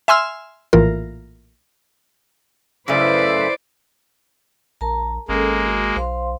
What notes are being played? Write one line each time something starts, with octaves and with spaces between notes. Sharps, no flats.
E5 G#5 C6 E6 F6
A#1 A2 E3 F4 A#4
F#2 C#3 A3 E4 B4 C5 D5
A#1 A#4 A5 A#5
G#1 G#3 A#3 C#4 A4
F#4
B1 C5 F5 C6